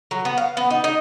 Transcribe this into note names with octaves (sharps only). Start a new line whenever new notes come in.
F#3
B3
F5
B3
D#4
D#4